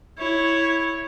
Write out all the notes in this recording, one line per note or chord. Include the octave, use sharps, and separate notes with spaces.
E4 C#5